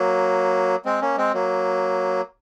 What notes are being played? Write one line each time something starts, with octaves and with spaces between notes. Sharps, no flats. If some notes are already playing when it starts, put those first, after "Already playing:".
Already playing: F#3 A#3
G#3 C4
A#3 C#4
G#3 C4
F#3 A#3